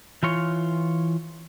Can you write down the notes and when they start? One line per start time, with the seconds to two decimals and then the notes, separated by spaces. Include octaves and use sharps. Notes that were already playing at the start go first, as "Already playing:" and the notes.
0.23 E3 F4 C#5